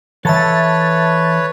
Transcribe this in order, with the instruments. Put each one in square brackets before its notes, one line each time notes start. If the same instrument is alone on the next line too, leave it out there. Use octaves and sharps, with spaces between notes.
[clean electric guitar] E3 A4 F5 [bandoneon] B4 C#5 [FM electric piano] E5 A5 A6